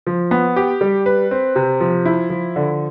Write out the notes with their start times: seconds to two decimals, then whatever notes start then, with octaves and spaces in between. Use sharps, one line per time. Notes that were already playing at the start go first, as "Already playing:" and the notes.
0.07 F3
0.31 B3
0.56 G4
0.81 G3
1.06 B4
1.31 C4
1.56 C3
1.80 F3
2.05 E4
2.30 F3
2.56 D3